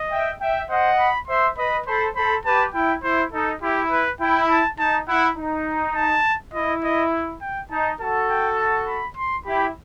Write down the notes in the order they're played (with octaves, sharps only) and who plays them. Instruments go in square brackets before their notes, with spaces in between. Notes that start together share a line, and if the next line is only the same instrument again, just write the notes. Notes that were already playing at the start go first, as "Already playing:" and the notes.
Already playing: [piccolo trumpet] D#5
[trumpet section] E5 G5
E5 G5
[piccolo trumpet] C5 [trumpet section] D#5 F#5
[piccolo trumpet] B5
[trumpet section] C5 E5 [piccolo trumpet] C6
[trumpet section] B4 D#5 [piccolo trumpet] B5
[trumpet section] A4 C5 [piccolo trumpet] B5
[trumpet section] A4 C5 [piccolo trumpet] B5
[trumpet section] G4 B4 [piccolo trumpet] A5
[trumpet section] E4 [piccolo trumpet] G5
[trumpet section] E4 [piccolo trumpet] C5
[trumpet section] D#4 [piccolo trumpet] A4
[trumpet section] E4 [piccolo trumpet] G4
[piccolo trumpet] B4
[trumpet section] E4 [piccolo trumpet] G5
[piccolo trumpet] A5
[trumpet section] D#4 [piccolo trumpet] A5
[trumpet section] E4 [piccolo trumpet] F#5
[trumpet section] D#4
[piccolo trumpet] A5
[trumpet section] E4 [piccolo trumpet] D#5
[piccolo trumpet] D#5
G5
[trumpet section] D#4 [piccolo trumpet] A5
[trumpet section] F#4 A4 [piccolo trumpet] A5
[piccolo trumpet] G5
A5
B5
C6
[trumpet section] E4 G4 [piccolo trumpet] B5